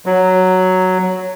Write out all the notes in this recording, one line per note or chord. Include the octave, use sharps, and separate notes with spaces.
F#3